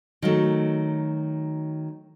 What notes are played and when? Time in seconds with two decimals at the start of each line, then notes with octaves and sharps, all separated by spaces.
0.22 D#3 F#3 A3